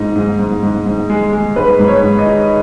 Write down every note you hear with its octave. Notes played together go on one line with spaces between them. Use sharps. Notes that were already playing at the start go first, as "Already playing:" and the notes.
Already playing: G#2 D#4
G#2
G#2
G#2
G#2
G#3
G#3
G#2 B4
G#2
C#5
G#2
D#5
D#4